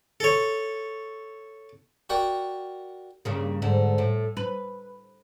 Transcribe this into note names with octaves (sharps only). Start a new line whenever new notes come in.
A4 C#5
F#4 A#4 D5 F#5 G5
G2 C#3 A#3
G#2 D3
A2
B4